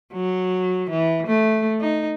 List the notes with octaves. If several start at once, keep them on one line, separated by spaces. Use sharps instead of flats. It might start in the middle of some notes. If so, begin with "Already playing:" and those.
F#3
E3
A3
D#4